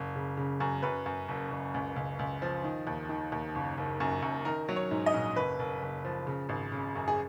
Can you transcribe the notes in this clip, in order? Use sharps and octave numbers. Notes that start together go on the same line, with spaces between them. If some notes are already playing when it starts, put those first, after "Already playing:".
Already playing: F#1
C#3
C#3
F#2
F#2 B4
F#2
F#1
F#1
C#2
C#2
C#2
F3
D#3
D#2
D#3
D#2
F#1
F#1
F#2
F#2
D#3 A#4
F#3
C#5
G#2
D#5
A#1
F#1 B4
F#1
F#1
F3
C#3
G#1
C#3
F#2
G#4